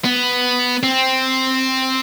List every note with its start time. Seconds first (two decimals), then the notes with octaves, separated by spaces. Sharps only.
0.04 B3
0.83 C4